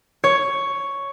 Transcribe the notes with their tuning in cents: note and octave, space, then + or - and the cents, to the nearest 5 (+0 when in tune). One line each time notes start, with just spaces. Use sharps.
C#5 +5